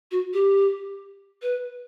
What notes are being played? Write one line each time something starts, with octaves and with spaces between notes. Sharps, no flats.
F#4
G4
B4